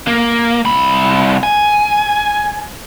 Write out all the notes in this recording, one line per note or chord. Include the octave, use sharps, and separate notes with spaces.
A#3
C2 B5
G#5